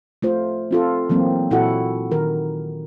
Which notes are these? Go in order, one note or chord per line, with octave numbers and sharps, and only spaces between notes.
A3 F4 C5
C4 F4 A4
E3 F#3 A#3 C4
A#2 E4 F#4 A4 F#5
D#3 A#4